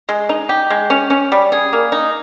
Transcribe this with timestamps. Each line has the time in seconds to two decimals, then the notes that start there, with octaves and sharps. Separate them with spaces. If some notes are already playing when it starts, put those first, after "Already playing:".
0.09 G#3
0.29 D#4
0.49 G4
0.70 G#3
0.90 C#4
1.10 C#4
1.32 G3
1.52 G#4
1.73 A#3
1.92 D#4